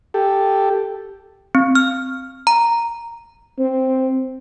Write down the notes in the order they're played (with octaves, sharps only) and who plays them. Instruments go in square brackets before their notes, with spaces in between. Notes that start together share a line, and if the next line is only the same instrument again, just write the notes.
[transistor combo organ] G4 A4
[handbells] C4
F6
A#5
[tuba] C4